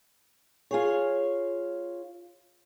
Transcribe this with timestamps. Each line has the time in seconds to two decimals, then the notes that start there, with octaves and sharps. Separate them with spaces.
0.71 F4 G#4 C#5